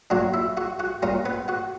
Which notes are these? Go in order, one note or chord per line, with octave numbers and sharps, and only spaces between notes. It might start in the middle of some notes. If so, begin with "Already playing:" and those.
A#2 F#3 A#3 D4 F#4 F#5
E4 E5
F#4 F#5
F#4 F#5
A#2 G3 A#3 C#4 A#4
B3 B4
F#4 F#5